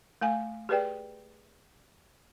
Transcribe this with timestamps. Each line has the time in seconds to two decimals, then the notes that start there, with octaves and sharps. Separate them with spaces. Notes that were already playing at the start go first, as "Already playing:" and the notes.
0.21 A3 F5 G#5
0.69 G4 G#4 B4 D5 G5